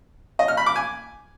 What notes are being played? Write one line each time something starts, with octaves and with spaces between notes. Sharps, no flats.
D#5
F6
B5
D6
G#5